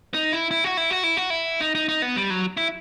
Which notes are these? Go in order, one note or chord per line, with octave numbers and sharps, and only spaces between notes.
D#4
E4
E4
F#4
E4
F#4
E4
F#4
E4
D#4
D#4
D#4
B3
G3
F#3
E4